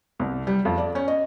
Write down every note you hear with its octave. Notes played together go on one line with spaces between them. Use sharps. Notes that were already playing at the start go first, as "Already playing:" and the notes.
C2
G3
F2
D5
C#4
D#5